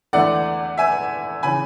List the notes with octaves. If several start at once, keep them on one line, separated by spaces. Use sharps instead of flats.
E2 D3 A3 E4 D5 F#5
E5 G#5
C#3 E3 G#5 B5